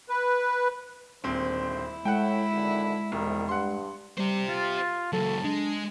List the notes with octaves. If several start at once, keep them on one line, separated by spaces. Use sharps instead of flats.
B4
D#1 G#1 D3 C4 C5
E4
A2 G#3 F#5 G5
G#1 D3
E1 C2 F2 D#3
G2 F#5 C6
G3 G4 C5
F4 A6
C#2 F#3 A4 A5
G#3 D4